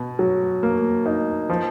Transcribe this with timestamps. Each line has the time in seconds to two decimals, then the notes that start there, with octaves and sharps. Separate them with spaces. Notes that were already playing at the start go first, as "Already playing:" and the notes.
Already playing: B2
0.19 F#3
0.63 A#3
1.06 D#4
1.50 F3